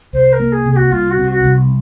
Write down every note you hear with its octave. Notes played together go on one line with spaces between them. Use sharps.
C2 C5
A#4
A#3
G#4
C3
G#4
F#4
C2 F4
F#4
C3
F#4
C2